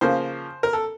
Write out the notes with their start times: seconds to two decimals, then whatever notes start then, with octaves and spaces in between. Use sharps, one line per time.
0.01 C#3 F3 A#3 C5
0.63 A#4
0.73 A4